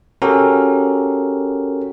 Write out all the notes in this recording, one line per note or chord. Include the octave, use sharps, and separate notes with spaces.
C#4 F#4 G4 A4 A#4